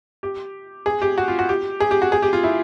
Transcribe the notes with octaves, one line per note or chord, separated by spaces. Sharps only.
G4
G#4
G4
F#4
F4
F#4
G4
G#4
G4
F#4
G#4
G4
F4
E4